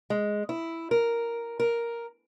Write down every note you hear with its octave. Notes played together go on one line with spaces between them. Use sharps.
G#3
E4
A#4
A#4